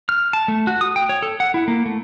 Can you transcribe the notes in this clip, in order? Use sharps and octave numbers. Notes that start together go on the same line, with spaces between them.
F6
A5
A3
F#4
D#6
G5
C#5
A4
F#5
E4
A#3
A3